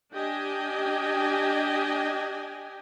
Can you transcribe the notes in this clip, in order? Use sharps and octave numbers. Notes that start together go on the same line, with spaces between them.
D4 G4 D#5 G5 G#5